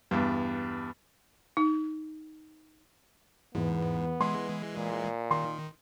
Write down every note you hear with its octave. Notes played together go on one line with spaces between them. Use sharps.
E2 G2
D#4
E2 G#2 B3
E3 G#3 C6
A#2
D#3 C6